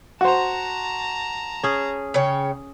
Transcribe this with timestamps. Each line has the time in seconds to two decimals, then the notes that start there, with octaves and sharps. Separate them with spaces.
0.21 F#4 C5 A5 A#5
1.64 C#4 G#4
2.14 C#3 C#5 G5